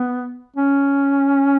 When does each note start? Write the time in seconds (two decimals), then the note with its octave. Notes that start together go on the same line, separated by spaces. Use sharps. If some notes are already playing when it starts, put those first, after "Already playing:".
Already playing: B3
0.56 C#4